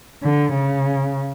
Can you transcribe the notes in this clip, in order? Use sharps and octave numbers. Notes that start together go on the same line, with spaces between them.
D3
C#3